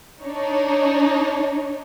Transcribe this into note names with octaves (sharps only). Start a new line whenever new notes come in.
D4 D#4 C#5